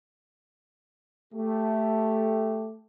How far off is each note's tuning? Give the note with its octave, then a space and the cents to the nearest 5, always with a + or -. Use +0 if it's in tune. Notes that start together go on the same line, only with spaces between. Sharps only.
A3 +0 G4 +0